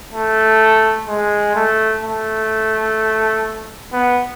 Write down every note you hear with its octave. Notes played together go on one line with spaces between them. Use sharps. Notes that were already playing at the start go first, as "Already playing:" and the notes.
A3
G#3
A3
A3
B3